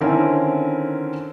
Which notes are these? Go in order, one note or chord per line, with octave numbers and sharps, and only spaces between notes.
D3 D#3 C4 C#4 E4 A#4